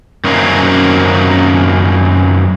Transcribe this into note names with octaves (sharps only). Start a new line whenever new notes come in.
F#2 D#3 F#3 A#3 C4 C#4